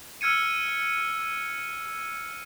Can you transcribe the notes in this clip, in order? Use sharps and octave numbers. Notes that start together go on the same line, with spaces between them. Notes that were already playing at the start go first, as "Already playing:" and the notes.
E6 F6 G#6 C#7 D#7